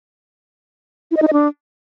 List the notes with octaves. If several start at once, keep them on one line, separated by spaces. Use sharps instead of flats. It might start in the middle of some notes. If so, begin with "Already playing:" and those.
E4
D#5
D#4
D#5
D4